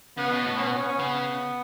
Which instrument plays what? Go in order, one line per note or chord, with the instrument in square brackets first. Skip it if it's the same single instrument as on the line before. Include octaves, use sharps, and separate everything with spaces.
[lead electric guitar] C#3 [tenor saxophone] B3
[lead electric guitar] B2
A2
[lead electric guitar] B2 [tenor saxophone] C#4
[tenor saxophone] B3
C#4
B3
C#4
[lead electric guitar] C#3 [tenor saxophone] B3